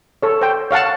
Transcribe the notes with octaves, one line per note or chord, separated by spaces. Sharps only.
A4 C#5
C5 G5
C#5 F5 F#5 A5